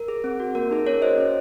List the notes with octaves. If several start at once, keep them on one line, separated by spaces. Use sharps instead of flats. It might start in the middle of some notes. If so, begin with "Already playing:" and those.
Already playing: A#4
G#4
C4
F#4
A#3 A#4
D#4 G#4
C#4 A#4 C#5
F#4 C5 D#5
C#4